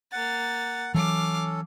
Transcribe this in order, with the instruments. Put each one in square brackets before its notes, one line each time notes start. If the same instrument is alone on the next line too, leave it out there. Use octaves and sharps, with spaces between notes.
[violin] A#3 A6 [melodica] F#5
[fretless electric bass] E3 F#3 [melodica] C#4 A4 [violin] F5 D6